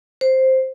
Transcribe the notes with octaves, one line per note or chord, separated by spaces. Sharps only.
C5